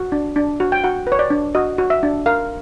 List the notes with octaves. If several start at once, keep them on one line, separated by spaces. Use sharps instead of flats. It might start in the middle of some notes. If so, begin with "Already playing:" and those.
Already playing: F#4
D4
D4
F#4
G5
F#4 F#5
B4
C#5
D5
D4
F#4 D#5
F#4
E5
D4
A#4 F5